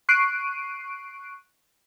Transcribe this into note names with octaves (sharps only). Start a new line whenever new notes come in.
C#6 F#6 C7 D7 D#7